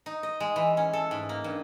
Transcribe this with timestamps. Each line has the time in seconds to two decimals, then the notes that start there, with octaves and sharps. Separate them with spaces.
0.06 D#4
0.23 D#5
0.40 G#3
0.56 E3
0.77 C#4
0.93 A4
1.11 G#2
1.29 A#3
1.44 G2